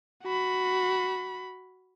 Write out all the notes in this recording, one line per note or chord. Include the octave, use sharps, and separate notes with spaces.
F#4 B5